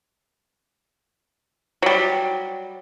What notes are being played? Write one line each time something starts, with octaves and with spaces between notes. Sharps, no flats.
F#3 G3